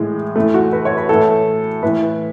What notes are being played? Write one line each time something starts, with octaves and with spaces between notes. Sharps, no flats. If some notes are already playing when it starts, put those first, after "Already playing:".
Already playing: A2 E3 G#3
A2 E3 A3
F#4
B4
C#5
B4
A2 E3 A4
A2 E3 B4